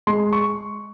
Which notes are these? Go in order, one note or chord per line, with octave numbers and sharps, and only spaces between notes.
G#3 C6
C#6